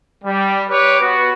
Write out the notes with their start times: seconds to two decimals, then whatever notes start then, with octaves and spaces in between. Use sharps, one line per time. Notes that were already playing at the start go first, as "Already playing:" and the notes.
0.24 G3
0.69 G4 B4 C#5 D6
1.01 B3 F#4